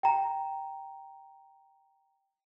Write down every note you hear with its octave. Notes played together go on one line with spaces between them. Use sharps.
G5 A#5